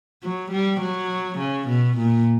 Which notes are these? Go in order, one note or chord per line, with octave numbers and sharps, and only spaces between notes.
F#3
G3
F#3
C#3
B2
A#2